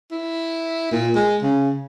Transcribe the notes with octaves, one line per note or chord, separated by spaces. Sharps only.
E4
A#2
G#3
C#3